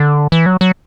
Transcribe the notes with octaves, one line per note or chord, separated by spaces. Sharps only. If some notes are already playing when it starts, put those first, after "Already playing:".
Already playing: D3
E3
F#3
F#3